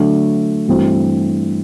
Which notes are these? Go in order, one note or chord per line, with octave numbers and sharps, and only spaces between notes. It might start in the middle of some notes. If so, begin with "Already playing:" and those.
Already playing: D3 F#3 A3 D4
G2 E3 A3 C4 F#4